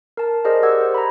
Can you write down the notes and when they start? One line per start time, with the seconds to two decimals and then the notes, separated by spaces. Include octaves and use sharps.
0.17 A#4 A5
0.45 G#4 A#4 C5 D5 D#5
0.63 G4 A#4 D5 F#5 E6 G#6
0.81 C5
0.94 A#5 B5